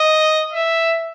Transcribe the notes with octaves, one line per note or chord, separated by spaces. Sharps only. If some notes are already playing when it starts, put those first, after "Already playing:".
Already playing: D#5
E5